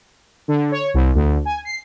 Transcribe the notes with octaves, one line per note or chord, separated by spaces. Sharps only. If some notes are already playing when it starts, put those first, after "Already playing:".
D3
C#5
C2
D2
G#5
C7